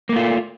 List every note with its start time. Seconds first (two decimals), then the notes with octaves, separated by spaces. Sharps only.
0.09 A#3
0.13 A3
0.16 F4